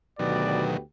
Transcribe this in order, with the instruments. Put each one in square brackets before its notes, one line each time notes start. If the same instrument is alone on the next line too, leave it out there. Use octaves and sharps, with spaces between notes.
[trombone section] D2 B3 G4 [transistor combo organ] B2 D#3 F#3 [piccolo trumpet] D5